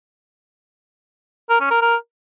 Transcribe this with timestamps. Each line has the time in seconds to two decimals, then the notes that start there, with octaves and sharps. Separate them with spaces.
1.50 A#4
1.60 C#4
1.71 A#4
1.81 A#4